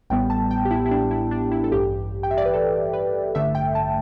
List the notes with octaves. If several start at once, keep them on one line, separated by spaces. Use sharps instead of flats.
A1 A2 G3 B3 G5
A5
G5
G4
E4
E4
D4
E4
D4
E4
A4
A1 G2 E3 G4
G5
E5
D5
B4
A4
B4
A1 G2 D3 A3 E5
G5
A5